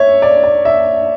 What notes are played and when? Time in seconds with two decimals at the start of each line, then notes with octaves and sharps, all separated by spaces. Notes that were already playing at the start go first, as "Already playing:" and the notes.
Already playing: C#5 E5
0.22 D5
0.43 D5
0.65 E5